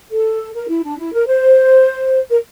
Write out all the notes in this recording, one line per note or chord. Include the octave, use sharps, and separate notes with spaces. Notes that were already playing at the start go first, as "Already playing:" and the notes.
A4
A#4
E4
D4
E4
A#4
C5
A#4